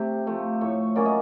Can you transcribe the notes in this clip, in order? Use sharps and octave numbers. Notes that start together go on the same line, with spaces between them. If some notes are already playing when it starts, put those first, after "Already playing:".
Already playing: C3 A3 G4
F3 A3
A2 C#5
F#3 A#3 C#4 D5
D#5